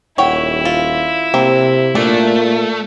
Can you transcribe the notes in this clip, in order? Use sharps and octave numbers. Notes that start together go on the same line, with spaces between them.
D#1 E4 C#5 F#5 G5
F4
C3 A#3 C4
A#2 A3 D4